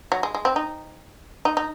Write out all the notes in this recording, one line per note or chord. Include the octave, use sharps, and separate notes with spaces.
F#3
G#3
G#3
C4
D#4
D#4
D#4